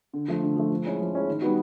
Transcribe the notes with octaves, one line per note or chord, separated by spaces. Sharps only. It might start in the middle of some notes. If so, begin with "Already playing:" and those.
D3
F3 A3
D3
F3 A3
F3
G#3 C#4 E4
F3
G#3 C#4 E4
D#3
G3 B3 D#4 F#4